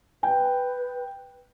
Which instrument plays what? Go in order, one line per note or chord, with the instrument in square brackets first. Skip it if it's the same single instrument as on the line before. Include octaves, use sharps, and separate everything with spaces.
[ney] B4 [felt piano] G5